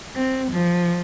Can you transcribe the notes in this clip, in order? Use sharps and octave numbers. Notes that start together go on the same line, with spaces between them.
C4
F3